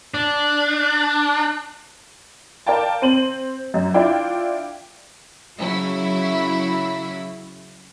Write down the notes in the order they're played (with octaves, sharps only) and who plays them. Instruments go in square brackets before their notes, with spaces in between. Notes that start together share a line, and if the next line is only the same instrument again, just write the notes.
[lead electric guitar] D4
[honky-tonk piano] A#4 D5 F5 G5 A5
C4 D#7 F#7
F#2
D4 E4 F4 D5 G5
[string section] C#3 F#3 E4